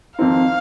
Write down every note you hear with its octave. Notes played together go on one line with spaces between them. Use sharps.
F2 D#3 C4 D#4 F5